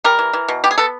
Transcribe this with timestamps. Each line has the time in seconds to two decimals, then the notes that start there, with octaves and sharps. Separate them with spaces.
0.04 G3 A#4
0.19 E3
0.33 E3
0.48 B2
0.64 B3 G4
0.71 G#4
0.78 B3 A4